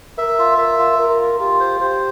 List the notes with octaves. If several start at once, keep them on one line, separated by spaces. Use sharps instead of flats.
A#4 E5
F4
A#4 E5
F4
F4 A#4
F4
F4 G4
C5
G4 C5